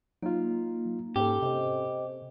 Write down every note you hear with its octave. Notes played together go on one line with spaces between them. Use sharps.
F#3 A#3 D#4 F4
G#2 C#4 G4 A4
C3 C5 D#5